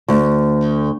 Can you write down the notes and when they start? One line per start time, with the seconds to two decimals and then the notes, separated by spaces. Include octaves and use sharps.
0.08 D2